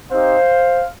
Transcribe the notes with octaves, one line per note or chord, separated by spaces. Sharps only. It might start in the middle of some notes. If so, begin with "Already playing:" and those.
C4 D#4 G4 C5 F5